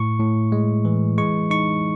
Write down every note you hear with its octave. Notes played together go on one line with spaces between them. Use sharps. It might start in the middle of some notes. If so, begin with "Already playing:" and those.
Already playing: A2 C#6
A2
G#3
E3
G#3 C#6
D#4 C#6